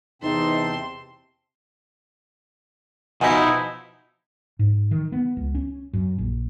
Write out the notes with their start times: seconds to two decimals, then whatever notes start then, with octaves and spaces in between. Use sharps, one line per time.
0.22 E2 C3 C4 D#4 A5 C6
3.21 B2 F3 D#4 E4 D#5 F#5 G#5
4.59 G#2
4.91 D#3
5.12 B3
5.37 C#2
5.55 C#4
5.93 F#2
6.18 A#1